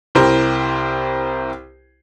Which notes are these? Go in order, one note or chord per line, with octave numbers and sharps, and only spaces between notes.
C2 E4 G4 A#4 C5